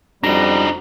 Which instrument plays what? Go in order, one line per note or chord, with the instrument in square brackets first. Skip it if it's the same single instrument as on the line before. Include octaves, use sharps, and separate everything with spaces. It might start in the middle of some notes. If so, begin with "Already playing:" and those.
[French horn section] F2 F#4 [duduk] G3 [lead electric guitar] D4 D#4 [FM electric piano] A#5